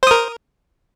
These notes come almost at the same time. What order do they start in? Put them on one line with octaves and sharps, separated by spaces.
C5 D#6 A#4